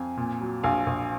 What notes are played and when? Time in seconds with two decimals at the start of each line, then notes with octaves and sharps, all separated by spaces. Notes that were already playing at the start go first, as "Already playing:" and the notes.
Already playing: F2 F5 G#5
0.17 A#2
0.41 F#3
0.63 A#1 F5 G#5
0.87 A#1